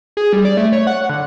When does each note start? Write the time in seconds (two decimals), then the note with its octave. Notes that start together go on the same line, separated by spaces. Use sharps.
0.17 G#4
0.33 G3
0.45 D5
0.57 A3
0.73 C#5
0.87 F#5
1.09 D3